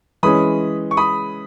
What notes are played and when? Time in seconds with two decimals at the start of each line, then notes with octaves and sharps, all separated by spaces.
0.23 E3 G#3 C#4 B5 D#6
0.91 C#6
0.97 B5 D#6